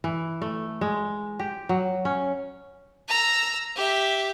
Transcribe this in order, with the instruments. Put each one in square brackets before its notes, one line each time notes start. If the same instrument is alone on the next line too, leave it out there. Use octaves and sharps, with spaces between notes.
[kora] E3
A3
G#3
G4
F#3
C#4
[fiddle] A#5 E6
G4 E5